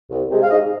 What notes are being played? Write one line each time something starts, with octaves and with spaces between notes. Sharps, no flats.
C2
C3 G#3
F5
G#2 D#5